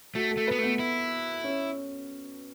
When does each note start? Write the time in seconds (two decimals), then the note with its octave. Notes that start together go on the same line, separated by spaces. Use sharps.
0.15 A3 F#4
0.31 A4
0.37 A3
0.47 B3 B4
0.58 A3 B3
0.79 E4
1.44 C#4